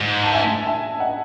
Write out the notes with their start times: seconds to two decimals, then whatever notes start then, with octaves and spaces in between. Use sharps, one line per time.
0.01 G#2
0.24 A5
0.33 E5 G#5
0.66 E5 G#5
1.00 D#5 F#5